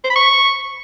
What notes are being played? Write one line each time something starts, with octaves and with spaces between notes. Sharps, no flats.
C5
B5
C#6